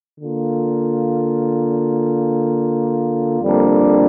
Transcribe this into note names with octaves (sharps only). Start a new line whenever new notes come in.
D3 A#3 F4
F2 D3 G3 A#3 D4